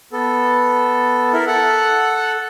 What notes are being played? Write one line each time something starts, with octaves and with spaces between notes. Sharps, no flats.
B3 A4
E4 A#4
A4 F#5